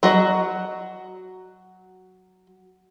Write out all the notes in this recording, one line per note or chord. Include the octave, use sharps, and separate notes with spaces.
F#3 F#4 D#5